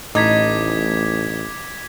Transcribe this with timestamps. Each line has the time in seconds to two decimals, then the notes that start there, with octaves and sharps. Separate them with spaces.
0.15 A1 A2 D#4 D6 G#6 B6